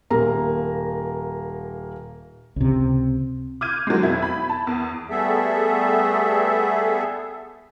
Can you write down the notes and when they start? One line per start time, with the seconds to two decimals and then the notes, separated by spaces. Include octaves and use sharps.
0.11 D#1 A#3 A#5
2.56 C#2 C3
3.61 D6 F6 G6 G#6 D#7
3.87 F#3 G#3
4.03 F2 B2 E4 G#6
4.22 B5
4.49 A5
4.67 E2
5.10 G3 A3 B3 G#4 A4 E5